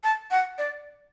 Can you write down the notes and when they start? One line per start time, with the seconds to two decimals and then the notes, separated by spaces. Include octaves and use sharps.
0.04 A5
0.31 F#5
0.58 D5